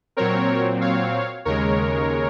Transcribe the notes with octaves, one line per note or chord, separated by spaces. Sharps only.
A#2 F#3 C4 A#4 C#5
C#5 F5
D#2 C#3 G#3 A#4 C#5